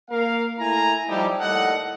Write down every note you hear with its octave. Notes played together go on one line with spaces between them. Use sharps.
A#3 A#4 F5
A3 E4 G#5 A#5
F3 G3 D#4 E4 G4
D#2 A2 G3 A4 D#5 F#5